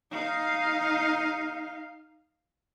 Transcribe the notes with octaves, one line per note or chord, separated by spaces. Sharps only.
D#4 F5